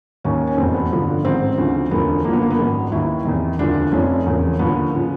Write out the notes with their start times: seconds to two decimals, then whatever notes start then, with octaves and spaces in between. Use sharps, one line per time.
0.24 D#2 D#3 C#4
0.47 C#4
0.58 F1 E2 B2 C4
0.74 B3
0.91 G1 G2 D3 F3
1.24 A1 G#2 D#3 C4
1.58 D2 C#3 F3
1.91 E1 D2 D3 F3 B3
2.24 F#1 F#2 D3 F3 A#3
2.33 B3
2.42 A#3
2.50 B3
2.59 G#1 F#2 D#3
2.92 D#2 D#3 E4
3.25 E2 C3 D#3
3.59 E1 D2 D3 F3 D4
3.92 F1 F2 C3 F3 C#4
4.26 E1 E2 C#3 F3
4.59 D#2 D3 F3 B3
4.94 C#3 F3